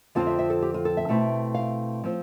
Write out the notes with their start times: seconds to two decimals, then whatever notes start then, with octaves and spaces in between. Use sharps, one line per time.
0.15 F2 D3 F3 C4 F4 F5
0.27 E5
0.39 E5
0.50 A4
0.62 G4
0.74 F4
0.85 A4
0.97 E5
1.09 B2 A3 C4 E4
1.55 F5
2.04 F3 C4